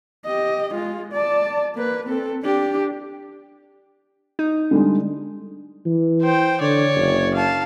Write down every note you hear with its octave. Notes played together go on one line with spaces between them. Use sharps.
G4 D#5
G#3 F4
D5 A5
A#3 B4
C4 A4
D4 G4
D#4
D3 G3 G#3
E3
C5 G5
D3 C#5 D5
F#1
F5 A5